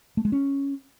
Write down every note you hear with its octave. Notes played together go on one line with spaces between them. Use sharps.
A3
G#3
C#4